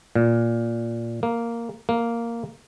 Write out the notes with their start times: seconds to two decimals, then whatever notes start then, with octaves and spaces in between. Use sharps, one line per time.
0.16 A#2
1.23 A#3
1.89 A#3